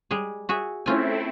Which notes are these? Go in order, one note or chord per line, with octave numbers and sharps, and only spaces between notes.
G3 G#3 G#4
F#4 G#4 E5
A3 C4 C#4 E4 F4 G#5